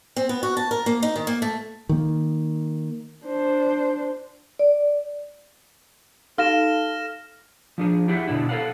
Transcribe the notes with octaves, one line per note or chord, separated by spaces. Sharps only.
C4
B3
F#4
A5
A#4
A#3
D#4
D#3
A#3
A3
D#3 A#3
D4 C5
D5
D#4 A4 F5 F6 A#6 E7
F3 D4 G#4
E4 G4 G#4 E5 F#5
B2 D3 D4 E4
A4 B4 F5 F#5